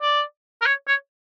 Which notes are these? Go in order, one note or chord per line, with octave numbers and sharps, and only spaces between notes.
D5
A#4
C#5
C#5